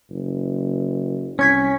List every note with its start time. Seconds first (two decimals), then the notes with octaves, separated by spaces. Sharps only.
0.10 F#1
1.39 C2 C#4 C#6 G#6 B6